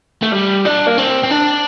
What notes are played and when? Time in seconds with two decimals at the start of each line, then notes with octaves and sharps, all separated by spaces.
0.23 A3
0.32 G3
0.65 D4
0.87 A#3
0.98 C4
1.23 C4
1.30 D4